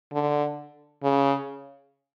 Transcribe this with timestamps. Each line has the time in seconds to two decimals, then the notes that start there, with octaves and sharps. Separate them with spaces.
0.12 D3
1.03 C#3